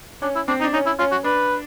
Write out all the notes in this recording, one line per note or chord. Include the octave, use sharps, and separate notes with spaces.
C#4 D4
E4
C4 D4
D#4
D4
C#4 D#4
E4
C#4 F4
F#4
D4 B4